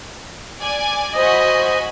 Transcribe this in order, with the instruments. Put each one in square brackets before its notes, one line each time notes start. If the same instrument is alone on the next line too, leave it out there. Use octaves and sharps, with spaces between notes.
[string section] D5 G#5
[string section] F#4 G#5 B5 [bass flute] C5 [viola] D#5